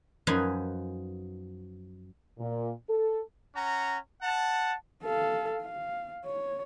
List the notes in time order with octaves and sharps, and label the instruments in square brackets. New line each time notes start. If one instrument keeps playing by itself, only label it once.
[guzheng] F#2 F3 D#4 B4 F5 G#5
[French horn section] A#2
A4
[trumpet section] C#4 F#5 A#5
F#5 A5
[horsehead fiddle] A4 F5
F5
C#5